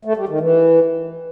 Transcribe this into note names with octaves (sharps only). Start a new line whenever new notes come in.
A3
G3
D#3
E3